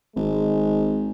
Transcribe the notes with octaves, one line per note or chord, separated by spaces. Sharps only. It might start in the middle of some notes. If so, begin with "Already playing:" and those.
G#1 G#3